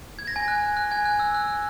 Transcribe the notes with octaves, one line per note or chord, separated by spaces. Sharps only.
G#6
A#6
G#5 G#6
F#6
F#6
G#5 G#6
F#6
E6
F#6